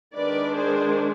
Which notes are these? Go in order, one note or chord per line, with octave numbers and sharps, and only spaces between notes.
D#3 G#3 D4 B4 D5
G#4 C5